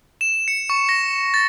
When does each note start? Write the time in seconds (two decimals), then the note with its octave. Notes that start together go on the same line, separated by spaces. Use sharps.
0.21 E7
0.48 C#7
0.70 C#6
0.89 A#6
1.34 A6